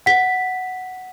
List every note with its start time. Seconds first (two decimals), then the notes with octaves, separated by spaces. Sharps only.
0.06 F#5 B6